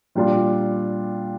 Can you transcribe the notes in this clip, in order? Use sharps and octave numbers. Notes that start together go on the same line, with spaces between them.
A#2 G3 D4 F4